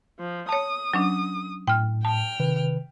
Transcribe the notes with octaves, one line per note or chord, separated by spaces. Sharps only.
F3
C#5 A5 D#6
F#3 C#4 D4
A2 G5 F6
G5 A5 F6
C3 D#3 B4